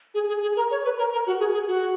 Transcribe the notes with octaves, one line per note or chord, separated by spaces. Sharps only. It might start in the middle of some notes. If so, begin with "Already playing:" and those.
G#4
G#4
G#4
A#4
C#5
B4
A#4
A#4
F#4
G#4
G#4
F#4